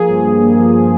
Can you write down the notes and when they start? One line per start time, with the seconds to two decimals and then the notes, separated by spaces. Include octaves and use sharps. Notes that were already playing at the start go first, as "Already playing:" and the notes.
Already playing: F3 A#3 G#4
0.08 G2
0.24 G2
0.41 A#3
0.58 F3